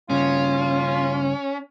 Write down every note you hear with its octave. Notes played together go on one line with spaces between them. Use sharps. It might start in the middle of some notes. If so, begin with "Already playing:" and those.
G2 C#3 C#4 F4